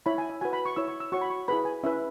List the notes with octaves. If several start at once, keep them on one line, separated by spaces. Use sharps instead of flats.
E4 C#5 B5
G#5
E5
F#4 B4 G#5
B5
C#6
E4 C#5 E6
C#6
E6
F#4 C#5 C#6
B5
C#6
E4 G#4 B4 B5
G#5
C#4 E4 B4 E5